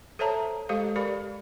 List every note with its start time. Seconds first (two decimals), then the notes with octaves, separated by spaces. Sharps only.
0.19 A4 C5 C#5 E5 A5 A#5
0.69 G#3 G4 A4 C5 F5
0.96 G4 A#4 D5 B5